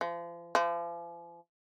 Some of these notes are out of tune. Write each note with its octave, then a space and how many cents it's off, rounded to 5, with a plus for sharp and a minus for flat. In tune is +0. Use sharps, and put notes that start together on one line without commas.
F3 -35
F3 -40